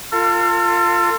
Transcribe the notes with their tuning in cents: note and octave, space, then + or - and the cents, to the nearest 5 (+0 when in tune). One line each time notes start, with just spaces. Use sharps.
F4 +0 A4 +40